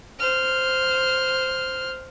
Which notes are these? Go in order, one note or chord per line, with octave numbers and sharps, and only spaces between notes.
C5 F6